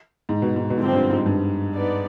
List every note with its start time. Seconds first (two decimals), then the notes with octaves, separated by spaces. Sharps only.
0.29 G#2
0.42 B2
0.56 G#2
0.70 B2
0.78 G#2 D3 F3 C4
0.93 G2
1.10 G#2
1.26 G2
1.74 B3 D#4 B4 D5